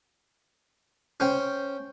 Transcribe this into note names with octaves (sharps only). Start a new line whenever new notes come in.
C#4 C5 G5